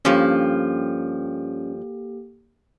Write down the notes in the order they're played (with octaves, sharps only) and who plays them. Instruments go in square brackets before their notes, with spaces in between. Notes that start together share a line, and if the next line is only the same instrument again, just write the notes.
[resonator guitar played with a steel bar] G2 F3 [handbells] A#3 G4 A4 [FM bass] C#4